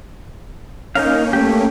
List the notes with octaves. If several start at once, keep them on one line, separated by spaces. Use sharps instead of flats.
A#3 C#4 D#4 A#4 F5
A3 G4